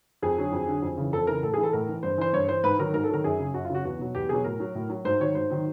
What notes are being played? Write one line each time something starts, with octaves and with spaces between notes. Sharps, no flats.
F2 G#4
D3 F#3
F2
D3 F#3
F2
C#3 E3
F2 A4
C#3 E3 A#4
A2 A4
G#4
E3
A4
A2 A#4
E3
G2 C5
E3 C5
G2 C#5
E3 C5
G#2 B4
D#3 F#3 A#4
G#2 A#4
A4
D#3 F#3 A#4
F#2 G#4
C#3 F#3
F#2 F#4
F4
C#3 F#3 F#4
E2 F#4
B2 F#3
E2 G4
B2 F#3 G#4
A2 A#4
F#3
A2
F#3
G#2 C5
D#3 F#3 C#5
G#2 C5
D#3 F#3